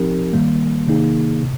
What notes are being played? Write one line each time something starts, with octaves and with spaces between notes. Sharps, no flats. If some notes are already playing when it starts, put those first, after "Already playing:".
Already playing: F3 C4 D#4 G4 A#4
D#3 G3 A#3
C3 D#3 A#3 D#4 G#4
C3